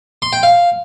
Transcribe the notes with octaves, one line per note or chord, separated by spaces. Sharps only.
C6
G5
F5